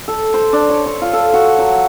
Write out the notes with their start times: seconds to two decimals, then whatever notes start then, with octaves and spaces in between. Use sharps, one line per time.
0.08 A4
0.34 C5
0.53 D4
0.70 C#5
0.86 C#5
1.02 F4
1.13 A4
1.34 F#4
1.58 F#3